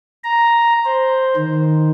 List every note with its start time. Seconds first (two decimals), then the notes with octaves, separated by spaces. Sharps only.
0.24 A#5
0.85 C5
1.36 D#3